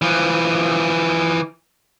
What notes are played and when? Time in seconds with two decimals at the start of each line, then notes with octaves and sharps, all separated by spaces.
0.02 E3 F3